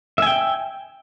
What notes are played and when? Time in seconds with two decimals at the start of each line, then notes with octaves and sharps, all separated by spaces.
0.18 E5
0.22 G#5
0.26 G5